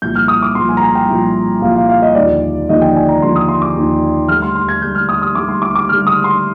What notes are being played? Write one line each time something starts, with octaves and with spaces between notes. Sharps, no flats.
C2 A#2 F3 G6
F6
D#6
D6
C2 A#2 F3 C6
G#5
A#5
G#5
G5
C2 A#2 F3
C2 A#2 F3 F5
F5
F5
D#5
D#2 D3 F3 D5
D#2 D3 F3 D#5
G5
G#5
A#5
D#2 D3 F3 C6
D#6
C6
D6
D#2 D3 F3
D2 D3 G3 F6
C6
C6
G#6
D2 D3 G3 G6
F6
D#6
D#6
D2 D3 G3 D6
C6
D6
D6
D2 D3 G3 F6
D#6
C6